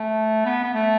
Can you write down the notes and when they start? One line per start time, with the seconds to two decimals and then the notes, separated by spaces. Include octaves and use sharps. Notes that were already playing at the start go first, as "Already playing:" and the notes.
Already playing: A3
0.46 B3
0.64 B3
0.74 A3